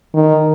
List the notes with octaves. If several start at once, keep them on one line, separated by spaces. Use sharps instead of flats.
D#3